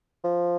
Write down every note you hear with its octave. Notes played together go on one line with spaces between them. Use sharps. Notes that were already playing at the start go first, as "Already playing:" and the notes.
F3